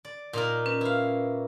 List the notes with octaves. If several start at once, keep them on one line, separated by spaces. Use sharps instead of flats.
D5
A#2 D#4 A#4
C#4 B4
E4 F5